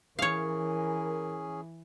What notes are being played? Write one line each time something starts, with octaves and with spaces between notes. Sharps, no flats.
E3 C#4 G#4 A#4 C#5 F5